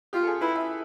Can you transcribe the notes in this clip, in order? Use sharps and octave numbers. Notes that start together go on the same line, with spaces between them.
F4 G4
A4
G#4
E4 B4
E5